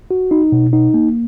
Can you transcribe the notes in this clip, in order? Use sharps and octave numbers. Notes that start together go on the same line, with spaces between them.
F#4
D#4
B2
D#4
A#3